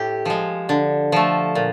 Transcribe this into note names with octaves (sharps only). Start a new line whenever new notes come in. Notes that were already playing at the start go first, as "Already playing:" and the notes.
Already playing: A2 G4
F3 G#3
D3
F3 A3
A#2